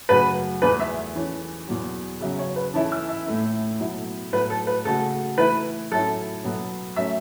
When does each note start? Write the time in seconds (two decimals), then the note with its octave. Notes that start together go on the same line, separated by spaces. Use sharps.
0.09 F#2 C#3 A3 F#4 B4
0.62 E2 E3 A3 B4
0.80 E5
1.15 E3 C#4 A4
1.68 E2 B2 F#3
2.20 C#3 F#3 C#4 E5
2.39 C#5
2.56 B4
2.74 E3 C#4 E4 A4 A5
2.92 E6
3.08 E5
3.27 A2 A3 E4
3.79 B2 F#3 A3 E4
4.33 A2 F#3 A3 B4
4.50 A4
4.67 B4
4.85 C#3 A3 F#4 A4
5.38 E3 A3 E4 B4
5.91 A2 F#3 A3 C#4 E4 A4
6.44 B2 F#3 B3 A4
6.96 F#3 A3 C#4 E5